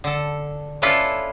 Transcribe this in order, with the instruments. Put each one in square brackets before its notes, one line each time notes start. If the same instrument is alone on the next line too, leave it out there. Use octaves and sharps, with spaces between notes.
[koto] D3 A4
C#4 D4 E4 F4 A4 B4